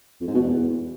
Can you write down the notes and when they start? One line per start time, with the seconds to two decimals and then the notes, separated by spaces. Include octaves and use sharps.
0.21 F2
0.28 G#2
0.34 B2
0.41 E2